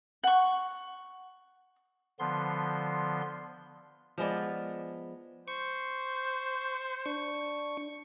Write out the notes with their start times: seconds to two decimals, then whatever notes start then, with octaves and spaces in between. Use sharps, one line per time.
0.24 F#5 C#6
2.19 D3 F3 B3 C6
4.18 F3 G#3 B3 D5
5.48 C5 C#6
7.06 D4 C#6